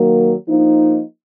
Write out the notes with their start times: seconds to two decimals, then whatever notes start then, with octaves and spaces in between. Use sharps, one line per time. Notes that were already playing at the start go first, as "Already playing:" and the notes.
Already playing: D#3 F#3 A#3
0.48 F3 A#3 D#4